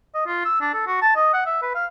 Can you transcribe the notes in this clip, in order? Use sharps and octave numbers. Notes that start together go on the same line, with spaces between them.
D#5
F4
E6
D4
A4
F#4
A5
D#5
F#5
E5
B4
F5